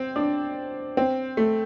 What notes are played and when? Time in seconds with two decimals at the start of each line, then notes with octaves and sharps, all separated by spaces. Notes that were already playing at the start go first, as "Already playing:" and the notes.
Already playing: C4
0.16 D4
0.97 C4
1.37 A3